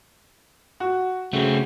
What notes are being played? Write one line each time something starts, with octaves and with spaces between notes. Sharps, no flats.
F#4
C#3 A3 C4 F#4